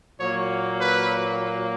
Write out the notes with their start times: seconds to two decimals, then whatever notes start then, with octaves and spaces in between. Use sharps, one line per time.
0.19 A#2 F#3 A#3 C#5
0.79 B4